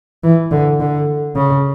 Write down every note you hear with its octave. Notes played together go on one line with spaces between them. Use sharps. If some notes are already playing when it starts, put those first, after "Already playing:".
E3
D3
D3
C#3